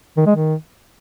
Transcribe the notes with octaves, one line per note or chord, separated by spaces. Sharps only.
D#3
G#3
D#3